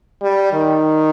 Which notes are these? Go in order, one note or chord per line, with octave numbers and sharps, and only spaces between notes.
G3
D#3